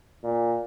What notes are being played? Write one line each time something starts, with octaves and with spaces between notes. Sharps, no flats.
A#2